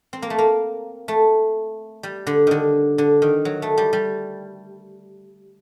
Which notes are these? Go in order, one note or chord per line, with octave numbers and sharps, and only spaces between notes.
C4
A#3
A3
A#3
A3
G3
D3
D3 D#3
D3
D#3
F#3
A3
G3
G3